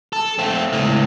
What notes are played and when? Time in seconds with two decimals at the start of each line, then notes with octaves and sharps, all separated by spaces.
0.13 A4
0.39 A3 C4
0.73 C#2 A2